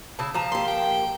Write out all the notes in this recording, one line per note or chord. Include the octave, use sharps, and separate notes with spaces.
C#3 E4 A5
F3 A5 A#5
A#3 G4 C6
G5